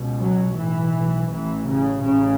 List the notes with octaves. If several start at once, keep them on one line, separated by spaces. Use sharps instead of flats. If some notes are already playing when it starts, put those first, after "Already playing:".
Already playing: C#2 B2
F#3
B1 A2 E3
A1 A2 E3
C#3
A1 C#3